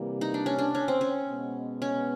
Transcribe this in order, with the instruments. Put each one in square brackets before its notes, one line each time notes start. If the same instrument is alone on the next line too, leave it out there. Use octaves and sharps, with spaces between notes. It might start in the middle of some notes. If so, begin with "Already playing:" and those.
Already playing: [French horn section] C3 E3 G3 A#3
[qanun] D#4
D4
C#4
D4
C#4
C4
C#4
[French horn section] B2 G#3 B3
[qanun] C#4